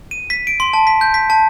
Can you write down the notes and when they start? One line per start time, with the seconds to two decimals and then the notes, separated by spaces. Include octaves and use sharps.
0.11 D#7
0.30 B6
0.47 D7
0.60 C6
0.74 A5
0.87 B6
1.01 G6
1.14 B6
1.30 A5